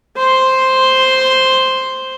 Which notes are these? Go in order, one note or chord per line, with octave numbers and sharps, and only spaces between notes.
C5 C6